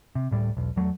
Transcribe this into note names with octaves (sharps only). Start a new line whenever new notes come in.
C3
D1 A2 G3
E1 B1
E2 F#3 G3 A3